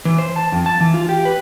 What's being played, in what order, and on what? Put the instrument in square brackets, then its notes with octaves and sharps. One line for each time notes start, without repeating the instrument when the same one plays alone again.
[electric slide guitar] E3
C5
A5
F2
A5
E3
F4
G4
B4